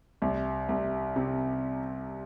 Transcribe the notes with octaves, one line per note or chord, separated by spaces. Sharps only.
C2
C2
C3